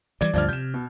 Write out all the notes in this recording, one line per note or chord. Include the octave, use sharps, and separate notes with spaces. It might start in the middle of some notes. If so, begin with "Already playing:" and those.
G2 E3 G3 D5 G#6
D2 G2 D3 F3 D5 F6
C3 G6 E7
B2